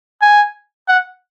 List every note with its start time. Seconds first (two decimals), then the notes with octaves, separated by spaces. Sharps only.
0.22 G#5
0.88 F#5